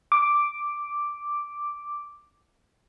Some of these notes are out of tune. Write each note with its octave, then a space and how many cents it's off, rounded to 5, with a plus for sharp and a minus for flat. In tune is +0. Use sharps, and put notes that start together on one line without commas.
D6 +0